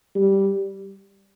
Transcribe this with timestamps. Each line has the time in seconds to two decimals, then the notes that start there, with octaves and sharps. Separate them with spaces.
0.15 G3